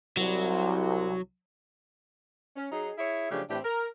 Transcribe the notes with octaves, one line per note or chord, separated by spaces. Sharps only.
C2 F#3
C#4
F#3 D#4 G#4
E4 G#4 C#5 E5
C#3 F3 F#3 A3 D4 G4
A2 E3 C4 D4 E4 G4
A#4